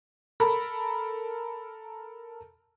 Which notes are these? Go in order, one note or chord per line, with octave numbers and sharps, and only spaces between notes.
A4 A#4 B5